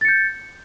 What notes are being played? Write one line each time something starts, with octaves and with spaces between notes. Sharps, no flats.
G6 A6 C#7